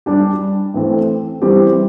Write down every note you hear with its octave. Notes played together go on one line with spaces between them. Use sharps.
G3 D4 G4
A2 E3 C4 A4
E3 G3 C4 G4